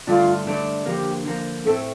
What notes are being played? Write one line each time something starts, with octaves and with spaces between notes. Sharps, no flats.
G2 D3 A3 D4 F4
G2 D3 A3 D4
D3 F3 A#3 G4
D3 F3 A#3
A2 A3 C4 A4